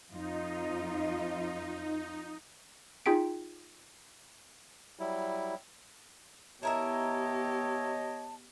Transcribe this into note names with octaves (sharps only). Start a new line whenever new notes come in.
F2 D#4 F4 D#5
D#4 F4 G#4 G5 B6 D7
F#3 G3 E4
B3 E4 G4 A#4 C#5 D#5 E5 A5